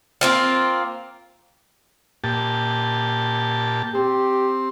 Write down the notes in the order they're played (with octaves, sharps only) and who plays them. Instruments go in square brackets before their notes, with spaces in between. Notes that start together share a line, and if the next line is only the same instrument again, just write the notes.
[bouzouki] A#3 C4 F4
[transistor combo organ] A#2 G4 A5
[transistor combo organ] C4 [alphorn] G4